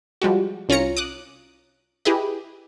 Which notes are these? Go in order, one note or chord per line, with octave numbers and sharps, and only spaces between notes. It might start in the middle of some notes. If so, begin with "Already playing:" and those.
F3 G3 G#3 F#4
C2 C#4 F4 C#5 A#5 C#7
D6 D#6 F#6
E4 G4 G#4 B4 D#5